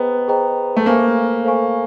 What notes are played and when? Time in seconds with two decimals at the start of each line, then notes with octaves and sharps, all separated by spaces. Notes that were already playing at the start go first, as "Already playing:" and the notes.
Already playing: B3 G#4 C5 D#5 G5 A#5
0.28 G#4 C5 D#5 G5 A#5
0.76 A3
0.86 A#3 A4 C5 F5 G#5 C#6
1.45 A4 C5 F5 G#5 C#6